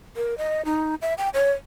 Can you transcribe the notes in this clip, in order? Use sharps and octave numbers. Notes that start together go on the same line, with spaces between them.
A#4
D#5
D#4
E5
G5
C#5